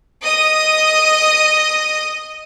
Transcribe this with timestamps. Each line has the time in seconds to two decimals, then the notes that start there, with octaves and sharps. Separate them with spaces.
0.23 D#5 D#6